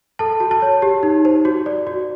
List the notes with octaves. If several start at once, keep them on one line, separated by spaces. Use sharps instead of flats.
A4 A5
F#4
A5
C#5
G4
D#4
C5
F#4
D5
F#4